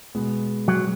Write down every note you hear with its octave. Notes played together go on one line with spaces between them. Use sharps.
B2 G#3 B3
F#3